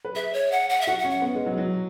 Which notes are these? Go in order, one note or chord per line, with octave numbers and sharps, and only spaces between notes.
B4
G#4 E5
C#5
F#5
F#5
E5
F#4 F#5
F#5
C#4
F#5
B3
G#3
F#3
F#3